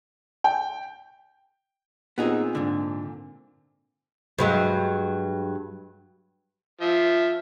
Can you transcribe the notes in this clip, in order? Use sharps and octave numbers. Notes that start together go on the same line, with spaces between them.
G5
A#2 B3 C4 D#4 G#4
G#2 D3
G2 F#3 G#3
F3 E5